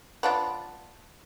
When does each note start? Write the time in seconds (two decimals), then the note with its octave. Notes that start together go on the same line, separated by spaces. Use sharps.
0.23 B3 D4 F4